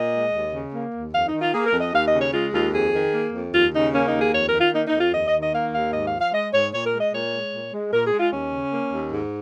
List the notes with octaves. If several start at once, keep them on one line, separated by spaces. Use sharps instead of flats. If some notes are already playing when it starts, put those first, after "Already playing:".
Already playing: A#2 D#5
G#3
D#2
C#3
A#3
D#2
F2 F5
D#4
D#3
F4
A#3 G#4
A#4
F2
D#5
D#2 F5
D#5
C#3
C#5
G#3 F4
D#2 F4
F2 G#4
D#3
A#3
F2
D#2 F4
C#3 D#4
A#3 C#4
D#4
D#2
G#4
F2 C#5
A#4
D#3
F4
A#3 D#4
D#4
F2
F4
D#2 D#5
D#5
D#3
D#5
A#3 F5
D#2 F5
G#2 D#5
F5
F3
F5
G#3 D#5
G#2 C#5
A#2 C#5
A#4
G#3
D#5
A#2 C#5
G#3
A#2
G#3
A#2 A#4
G#4
G#3
F4
D#2 C#4
C#3
A#3
D#2
G#2